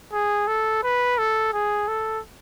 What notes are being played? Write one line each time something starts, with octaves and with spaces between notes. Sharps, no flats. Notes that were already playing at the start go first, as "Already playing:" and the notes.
G#4
A4
B4
A4
G#4
A4